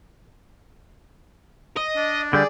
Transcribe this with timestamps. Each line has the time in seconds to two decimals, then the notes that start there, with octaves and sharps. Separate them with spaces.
1.77 D#5
1.96 D4
2.33 D3 G3 G#4 D5